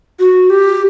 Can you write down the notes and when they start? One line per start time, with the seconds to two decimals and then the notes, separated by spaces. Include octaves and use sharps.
0.19 F#4
0.50 G4